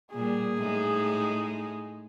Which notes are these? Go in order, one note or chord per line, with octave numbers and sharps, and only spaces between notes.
A#2 G3 G#4
A2 G#3 D#4